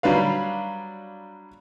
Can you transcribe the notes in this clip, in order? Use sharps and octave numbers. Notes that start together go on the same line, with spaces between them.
F#3 G3 D4 B4 F5